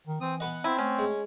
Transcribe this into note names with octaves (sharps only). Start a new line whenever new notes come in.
D#3
E3 C4 D#6
B3 B4 D#5 F#5
C4 E4
A3 C#4
G#3